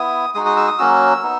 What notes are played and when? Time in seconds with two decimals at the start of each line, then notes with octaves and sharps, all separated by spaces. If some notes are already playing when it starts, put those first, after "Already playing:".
Already playing: B3 E4 D#6
0.35 G#3 D#4 F#4 D#6
0.46 D#6
0.57 E6
0.68 D#6
0.78 F#3 A#3 C#4 F#4 E6
1.22 B3 D#4